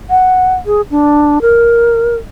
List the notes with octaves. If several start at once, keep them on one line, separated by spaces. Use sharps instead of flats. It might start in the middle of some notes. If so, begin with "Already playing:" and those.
F#5
G#4
D4
A#4